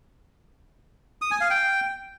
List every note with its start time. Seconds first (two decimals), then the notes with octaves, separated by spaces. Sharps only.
1.22 D#6
1.31 G#5
1.41 F5
1.50 G5